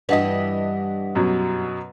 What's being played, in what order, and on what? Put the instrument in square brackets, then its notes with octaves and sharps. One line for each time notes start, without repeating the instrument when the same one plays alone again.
[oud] G2 E3 G3 [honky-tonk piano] D4 D#5 [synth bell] B4 F#5 B6
[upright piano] F#2 B2 F#3